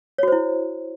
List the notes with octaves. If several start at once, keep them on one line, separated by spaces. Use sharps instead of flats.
E4 F#4 C5 C#5